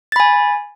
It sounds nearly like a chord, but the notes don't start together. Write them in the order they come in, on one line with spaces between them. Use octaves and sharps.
A6 B5 G#5